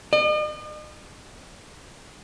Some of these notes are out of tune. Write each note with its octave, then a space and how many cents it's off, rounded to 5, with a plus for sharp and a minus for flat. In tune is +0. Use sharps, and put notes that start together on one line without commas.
D#5 -45